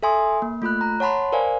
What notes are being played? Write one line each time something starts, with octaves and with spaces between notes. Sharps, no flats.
A4 E5 G#5 C6 D#6
A#3
A3 F4 B5 F#6
A#5
C#5 F#5 A5 B5 C6
A#4 C5 D5 F5 G#5